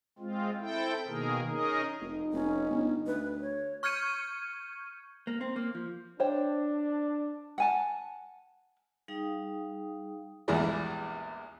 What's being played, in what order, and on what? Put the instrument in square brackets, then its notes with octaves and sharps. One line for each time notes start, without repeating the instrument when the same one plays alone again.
[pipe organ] G#3 C4 F4
C4 E4 A4 G5
B2 D#3 A#3 G#4 A#4
C#4 D#4 G#4 A#4 D#5
[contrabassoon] F1 [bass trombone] D#4
[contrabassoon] F1 [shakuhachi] C#4
[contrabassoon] G1
[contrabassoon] D2 [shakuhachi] B4
[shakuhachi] C#5
[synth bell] C#6 F6 G6 G#6 C#7 D#7
[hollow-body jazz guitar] A#3
C4
A#3
F3
[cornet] D4 [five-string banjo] C5 C#5 G5
[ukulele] F#5 G#5 A5
[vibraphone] G3 D#4 G#4 F5 G5 D#6
[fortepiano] A#1 E2 E3 G3 G#3